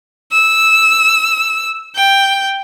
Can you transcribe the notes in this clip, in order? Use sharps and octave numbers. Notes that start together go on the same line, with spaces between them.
E6
G5